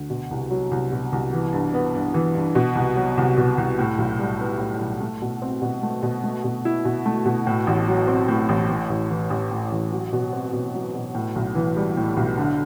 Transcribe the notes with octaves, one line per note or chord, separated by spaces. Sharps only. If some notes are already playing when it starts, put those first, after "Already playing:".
Already playing: D2
B2
C2
F#3
C2
B2
C2
E3
G2
B3
G2
E3
G2
B2
C2
F#3
C2
B2
C2
A2
B1
G3
B3
A2
B1
A3
B2
C4
B2
A3
B2
A3
B2
E4
B2
A3
B2
A2
A1
F#3
C4
A2
A1
A2
A1
E3
A1
A2
A1
F#3
B2
C4
B2
F#3
B2
A2
B1
E3
G3
A2
B1
D3